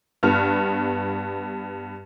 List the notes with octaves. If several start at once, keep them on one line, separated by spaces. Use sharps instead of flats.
G2 B3 F6